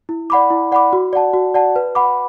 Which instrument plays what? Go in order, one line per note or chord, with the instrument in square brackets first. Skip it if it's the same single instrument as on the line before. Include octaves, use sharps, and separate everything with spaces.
[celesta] E4
D5 F#5 B5 D6
E4
D5 F#5 B5 D6
F#4
D5 F#5 A5
F#4
D5 F#5 A5
B4
F#5 B5 D6